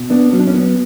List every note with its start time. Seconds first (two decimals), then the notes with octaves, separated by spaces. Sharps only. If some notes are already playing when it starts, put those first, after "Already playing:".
Already playing: B2
0.10 B3 D4
0.32 F#3 C#4
0.39 D4
0.47 C#4
0.54 B3